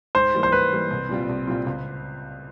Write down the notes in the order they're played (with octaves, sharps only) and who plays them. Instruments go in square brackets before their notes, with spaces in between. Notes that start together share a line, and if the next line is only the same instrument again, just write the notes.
[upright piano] G#2 [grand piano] C5
[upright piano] E3 G3 A#3
[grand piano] C5
[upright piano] G#2 [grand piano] B4
[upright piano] E3 G3 A#3
C2
A#2 G3 C4 F4
C2
A#2 G3 C4 F4
C#2